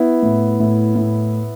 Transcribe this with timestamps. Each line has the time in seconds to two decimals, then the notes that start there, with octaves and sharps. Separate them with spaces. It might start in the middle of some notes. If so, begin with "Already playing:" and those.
Already playing: B3 E4
0.23 A2
0.60 A2
0.96 A2